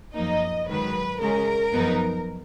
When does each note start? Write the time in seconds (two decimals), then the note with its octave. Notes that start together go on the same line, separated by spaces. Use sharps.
0.14 F#2 F3 A#3 D#4 D#5
0.67 G#2 D#3 F#3 B4
1.20 C#3 G#3 C#4 A#4
1.72 F#2 F3 B3 D#4